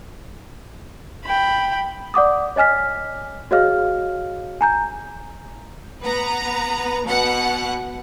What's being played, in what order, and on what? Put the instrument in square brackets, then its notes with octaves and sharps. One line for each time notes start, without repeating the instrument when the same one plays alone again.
[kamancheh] G5 B5
[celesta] D5 F#5 D6 D#6
C#5 D#5 G#5 F6 B6
F#4 G#4 C#5 D#5 F5 F6
G#5 A#5 G6
[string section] B3 B4 A#5
B2 B3 F#5